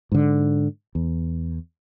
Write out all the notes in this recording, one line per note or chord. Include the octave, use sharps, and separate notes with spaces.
G#2 D3
E2